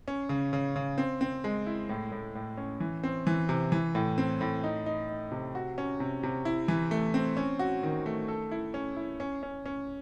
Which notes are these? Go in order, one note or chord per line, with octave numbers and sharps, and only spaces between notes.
C#4
C#3
C#3
C#3
C4
C4
G#3
E4
A2
A2
A2
C#4
E3
C4
E3
C3
E3
A2
C4
A2
D#4
D#4
D#4
C3
F#4
C#4
C3
C3
E4
E3
A3
C4
C#4
F#4
D#3
A3
A4
E4
C#4
E4
C#4
C#4
C#4